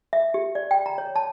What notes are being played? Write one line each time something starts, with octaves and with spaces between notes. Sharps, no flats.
E5
G4
D5
G5
A#5
C#5
A5